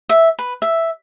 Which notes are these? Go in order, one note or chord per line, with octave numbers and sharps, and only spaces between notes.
E5
B4
E5